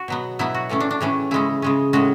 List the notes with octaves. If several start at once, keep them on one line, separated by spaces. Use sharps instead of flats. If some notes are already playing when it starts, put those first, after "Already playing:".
Already playing: F#4
B2 F#3 B3
B2 F#3 B3 E4
F#4
A2 E3 A3 C#4
D4
D4
A2 E3 A3 C#4
C#3 G#3 C#4 E4
C#3 G#3 C#4
A2 G#3 C#4 F#4